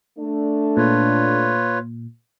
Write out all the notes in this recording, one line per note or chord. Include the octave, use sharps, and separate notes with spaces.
A3 D4
A#2 F4 B4 C#5